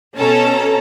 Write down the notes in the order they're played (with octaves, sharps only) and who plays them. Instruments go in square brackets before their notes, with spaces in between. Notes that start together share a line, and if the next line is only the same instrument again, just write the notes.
[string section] B2 C#4 A4 A5 A#5